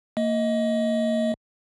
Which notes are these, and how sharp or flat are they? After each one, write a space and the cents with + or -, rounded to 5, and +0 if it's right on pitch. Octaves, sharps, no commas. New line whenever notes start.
A#3 -25 D#5 +20